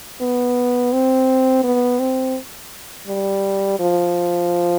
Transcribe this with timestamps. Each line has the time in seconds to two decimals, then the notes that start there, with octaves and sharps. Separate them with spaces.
0.21 B3
0.93 C4
1.64 B3
1.99 C4
3.07 G3
3.80 F3